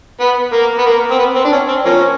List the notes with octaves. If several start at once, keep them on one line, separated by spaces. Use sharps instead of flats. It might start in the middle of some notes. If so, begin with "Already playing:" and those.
B3
A#3
B3
A#3
C4
B3
C4
D4
C#4
C4
F3 A#3 C#4